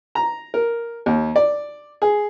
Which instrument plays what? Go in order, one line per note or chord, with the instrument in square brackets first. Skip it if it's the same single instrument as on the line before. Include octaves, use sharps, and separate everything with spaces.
[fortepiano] A#5
A#4
D#2
D5
G#4